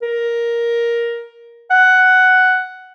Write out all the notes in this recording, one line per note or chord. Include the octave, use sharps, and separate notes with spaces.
A#4
F#5